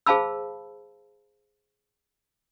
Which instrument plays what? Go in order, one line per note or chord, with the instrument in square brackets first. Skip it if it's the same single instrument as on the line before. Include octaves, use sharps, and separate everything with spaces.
[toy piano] G#4 C5 F5 A5 B5 E6